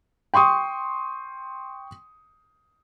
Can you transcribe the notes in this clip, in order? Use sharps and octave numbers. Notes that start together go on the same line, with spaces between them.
G5 C6 C#6 D#6